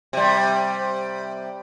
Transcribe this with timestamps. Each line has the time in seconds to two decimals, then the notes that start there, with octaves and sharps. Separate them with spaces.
0.13 C3 G3